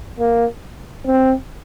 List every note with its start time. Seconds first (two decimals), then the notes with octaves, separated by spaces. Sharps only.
0.20 A#3
1.07 C4